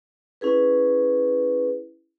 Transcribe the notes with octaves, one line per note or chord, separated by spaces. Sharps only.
C#4 E4 G#4 B4